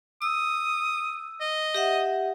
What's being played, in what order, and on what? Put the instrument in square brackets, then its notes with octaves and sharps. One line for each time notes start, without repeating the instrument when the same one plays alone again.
[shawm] D#6 [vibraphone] E6
[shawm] D#5
[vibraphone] G4 E5 F#5